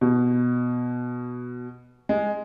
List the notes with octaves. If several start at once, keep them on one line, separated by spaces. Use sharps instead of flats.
B2
G#3